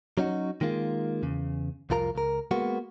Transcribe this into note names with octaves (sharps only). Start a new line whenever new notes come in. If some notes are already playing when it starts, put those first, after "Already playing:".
F#3 C#4 D#4 F#4
D#3 G#3 A#3 F4
E2 C#3
C2 F2 F4 A#4 A#5
C#2 A#4
G#3 A#3 B3 F#4